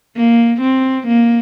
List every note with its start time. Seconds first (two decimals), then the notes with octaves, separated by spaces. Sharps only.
0.16 A#3
0.61 C4
1.07 A#3